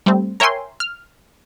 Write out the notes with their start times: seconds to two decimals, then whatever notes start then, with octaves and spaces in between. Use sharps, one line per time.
0.06 G3 A3 C4
0.40 A#4 C#5 E5 G5 G#5 C6
0.80 F6